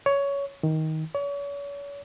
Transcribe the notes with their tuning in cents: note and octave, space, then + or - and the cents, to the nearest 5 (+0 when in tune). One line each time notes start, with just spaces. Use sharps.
C#5 +15
D#3 +15
C#5 +40